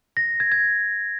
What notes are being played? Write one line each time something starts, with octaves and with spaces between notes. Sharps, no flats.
A#6
G#6
G#6